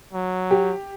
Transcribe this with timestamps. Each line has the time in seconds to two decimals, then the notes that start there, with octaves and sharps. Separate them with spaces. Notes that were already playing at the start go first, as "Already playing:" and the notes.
0.13 F#3
0.51 G4